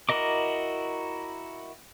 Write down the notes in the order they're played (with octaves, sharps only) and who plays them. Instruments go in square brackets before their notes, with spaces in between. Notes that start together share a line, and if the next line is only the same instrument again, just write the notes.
[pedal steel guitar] E4 F#4 A#4 D#5 D6